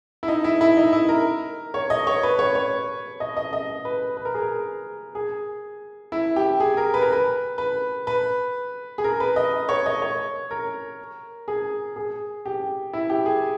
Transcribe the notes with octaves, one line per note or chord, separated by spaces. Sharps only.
E4
D#4
E4
E4
D#4
E4
A#4
C#5
D#5
C#5
B4
C#5
C#5
D#5
D#5
D#5
B4
B4
A#4
G#4
A#4
G#4
E4
G4
G#4
A#4
B4
A#4
B4
B4
B4
G#4
A#4
B4
D#5
C#5
D#5
C#5
A#4
G#4
G#4
G4
E4
G4
G#4